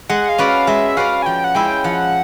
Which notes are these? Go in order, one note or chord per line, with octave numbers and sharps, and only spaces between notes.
G#3 F#5
F5
C#4 F#4 B4 D5
F5
G#3 E5
C#4 F#4 B4 D5 F5
G#5
F3 G5
F#5
G#3 C#4 E4 G5
F3 F#5